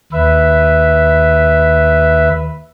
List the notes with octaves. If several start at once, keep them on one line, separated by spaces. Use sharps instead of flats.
D#2 B4 E5